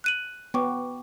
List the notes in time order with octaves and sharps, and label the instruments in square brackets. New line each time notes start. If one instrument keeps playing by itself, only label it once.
[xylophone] F#6 D#7 F#7
[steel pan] B3 [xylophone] G5 C#6 D6